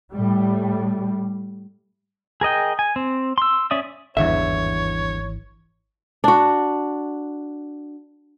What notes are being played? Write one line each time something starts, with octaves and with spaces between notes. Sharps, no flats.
A2 G3
G#4 A#4 D#5 G5
G#5
C4
C6 E6
C#4 D5 E5 D#6
G#1 E2 G2 D3 E3 C#5 E5
D4 F#4